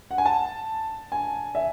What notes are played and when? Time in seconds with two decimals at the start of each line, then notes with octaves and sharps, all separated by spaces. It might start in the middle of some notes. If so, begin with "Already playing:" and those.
0.11 F#5
0.18 G#5
0.26 A5
1.12 G#5
1.55 E5